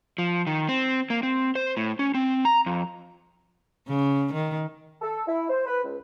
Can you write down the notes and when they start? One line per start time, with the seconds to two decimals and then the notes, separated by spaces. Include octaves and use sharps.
0.18 F3
0.47 D#3
0.69 C4
1.10 A#3
1.23 C4
1.55 C5
1.77 A2
1.99 C#4
2.14 C4
2.45 A#5
2.66 F2
3.88 C#3
4.33 D#3
5.02 A4
5.27 E4
5.50 C5
5.66 B4
5.84 C#2